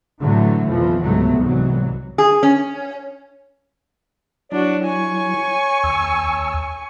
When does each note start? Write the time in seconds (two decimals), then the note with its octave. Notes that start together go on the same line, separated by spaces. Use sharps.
0.20 A2 D3 E3 F#3 A3
0.67 B1 F2 E3 F3
1.02 C#2 G#2 C3 F#3 A3 B3
1.36 C2 G#2 E3 F#3
2.18 G#4
2.43 C#4
4.52 F#3 D4 E4 F#4 C#5
4.85 G#5 C#6
5.84 D#2 A5 E6